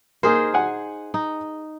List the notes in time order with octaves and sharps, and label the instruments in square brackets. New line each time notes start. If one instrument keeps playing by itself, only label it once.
[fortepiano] A#3 [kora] D#4 G#4 C5
[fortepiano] F#5 G#5
[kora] D#4